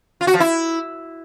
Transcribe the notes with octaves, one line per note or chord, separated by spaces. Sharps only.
F4
F#4
F3
E4